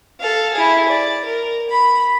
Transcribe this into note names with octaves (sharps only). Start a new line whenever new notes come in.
A4 F5
E4 G#4
D5
A#4
B5